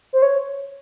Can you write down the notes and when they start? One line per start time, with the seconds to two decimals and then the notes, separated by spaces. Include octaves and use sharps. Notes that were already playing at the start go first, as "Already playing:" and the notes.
0.13 C5
0.22 C#5